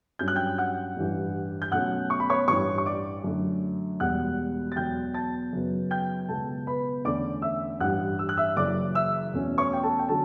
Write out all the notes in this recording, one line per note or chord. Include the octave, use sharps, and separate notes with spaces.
G2 F#3 C#4 G6
F#6
G5 G6
F#5 F#6
A1 G2 E3
G6
B1 B2 A3 C#4 F#5 F#6
C#6
B5
C#5 C#6
A1 G2 E3 C#5 C#6
C#6
D5 D6
F#2 D3 A3
E1 E2 B2 G3 F#5 F#6
A6
E2 B2 F#3 G5 G6
A5 A6
F#2 C#3 F#3 B3
G5 G6
C#2 B2 F#3 B3 A4 A5
B4 B5
E2 D3 A3 C#4 D5 D6
E5 E6
A1 G2 E3 F#5 F#6
E6
F#6
E5 E6
F#1 F#2 E3 D5 D6
E5 E6
E2 B2 A3 C#4
C#5 C#6
G5
A4 A5
G5
D3 F#3 C#4 A4 A5